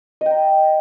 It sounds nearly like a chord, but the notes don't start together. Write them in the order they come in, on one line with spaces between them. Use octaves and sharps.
D#5 G5 A#5